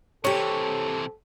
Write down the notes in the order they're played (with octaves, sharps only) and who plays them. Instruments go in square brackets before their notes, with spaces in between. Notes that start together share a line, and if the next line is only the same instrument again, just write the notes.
[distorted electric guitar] C3 E3 [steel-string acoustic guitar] C4 G4 [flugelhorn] A4 [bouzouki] C#5